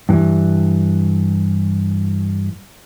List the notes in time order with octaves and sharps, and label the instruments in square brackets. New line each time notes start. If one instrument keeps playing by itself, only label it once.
[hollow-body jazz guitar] G2 E3